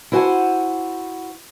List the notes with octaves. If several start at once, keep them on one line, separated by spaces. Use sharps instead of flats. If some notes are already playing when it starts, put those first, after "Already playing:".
E4 F#4 C5 F#5 G#5 A5